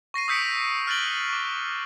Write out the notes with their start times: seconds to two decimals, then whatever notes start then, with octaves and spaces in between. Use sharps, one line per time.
0.14 C#6 A#6 C7 D#7
0.28 D#6 E6 G6 B6 C#7 D7
0.87 F6 F#6 A6 D7 F#7 G7
1.29 C#6 D6